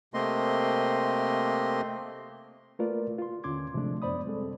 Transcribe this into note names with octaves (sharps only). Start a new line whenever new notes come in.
C3 A3 A#3 C4 D#5 C6
A3 A#3 F4 A#4 B4 D5
F4 C6
D#2 D3 C#4 C6 D6 G#6
C3 F3 G#3 A3 D4
F#2 B3 C5 D5 B5 D#6
G3 G#3 C4 A4